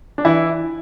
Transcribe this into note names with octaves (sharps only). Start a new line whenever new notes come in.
D4
E3 E4